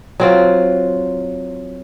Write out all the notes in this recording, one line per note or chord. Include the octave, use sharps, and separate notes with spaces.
F#3 C4 F4